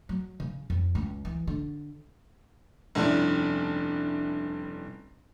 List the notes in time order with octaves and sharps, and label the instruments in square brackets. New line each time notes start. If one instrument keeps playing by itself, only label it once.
[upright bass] F#3
C#3
F2
C#2
E3
D3
[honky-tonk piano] F1 G2 C#4 D4 E4